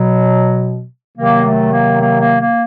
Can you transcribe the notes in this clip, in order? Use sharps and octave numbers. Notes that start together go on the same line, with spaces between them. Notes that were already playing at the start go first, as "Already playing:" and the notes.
Already playing: B2 F#3
C3 D#3 F#3 A#3
A3
A#3
A#3
A#3
A#3